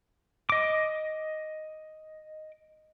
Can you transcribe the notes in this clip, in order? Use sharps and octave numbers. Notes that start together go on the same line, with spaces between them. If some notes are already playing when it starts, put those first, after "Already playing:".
D#5 D6